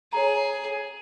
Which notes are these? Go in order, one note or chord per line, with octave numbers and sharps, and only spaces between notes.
G#4 C#5 A#5